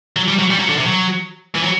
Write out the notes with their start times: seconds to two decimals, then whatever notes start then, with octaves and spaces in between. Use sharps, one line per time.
0.16 F#3
0.28 G3
0.39 F#3
0.51 G3
0.59 F#3
0.69 D3
0.78 C3
0.85 F#3
1.55 E3
1.64 F#3